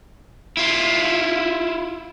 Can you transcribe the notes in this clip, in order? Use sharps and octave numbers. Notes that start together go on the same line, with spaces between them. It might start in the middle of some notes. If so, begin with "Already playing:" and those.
E4 F4